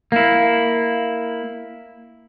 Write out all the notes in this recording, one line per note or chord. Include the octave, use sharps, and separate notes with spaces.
A#3 E4